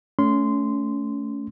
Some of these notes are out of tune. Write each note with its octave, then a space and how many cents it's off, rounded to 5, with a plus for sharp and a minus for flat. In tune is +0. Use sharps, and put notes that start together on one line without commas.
A3 +0 C#4 +25 C6 -15